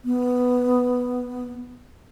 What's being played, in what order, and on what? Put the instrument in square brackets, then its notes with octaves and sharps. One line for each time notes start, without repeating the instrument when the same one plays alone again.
[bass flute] B3